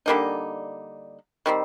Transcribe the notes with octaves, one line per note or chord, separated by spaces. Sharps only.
D3 G3 A#3 D#4
D#3 G3 C4